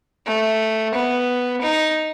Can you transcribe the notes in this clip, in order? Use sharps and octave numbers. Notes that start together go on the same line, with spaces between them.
A3
B3
D#4